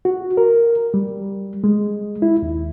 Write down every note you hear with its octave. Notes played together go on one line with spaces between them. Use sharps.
F#4
A#4
G3
G#3
E4
D#2